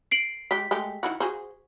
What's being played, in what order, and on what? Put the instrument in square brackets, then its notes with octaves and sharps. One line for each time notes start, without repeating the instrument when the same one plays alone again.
[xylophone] C7 D7 F#7
[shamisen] G#3 G4 [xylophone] B6
[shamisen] G#3 A3 G4
D#3 E4 F#4
F#4 G#4 C5